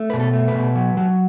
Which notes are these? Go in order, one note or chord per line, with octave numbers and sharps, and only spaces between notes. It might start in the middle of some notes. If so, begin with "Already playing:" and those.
Already playing: A3
B2 B4
A4
A3
B4
B2
F#3
F#3